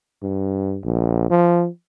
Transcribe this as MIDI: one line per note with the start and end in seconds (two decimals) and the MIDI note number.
0.23 0.79 43
0.84 1.29 34
1.30 1.68 53